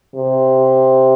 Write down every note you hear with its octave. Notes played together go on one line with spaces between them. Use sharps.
C3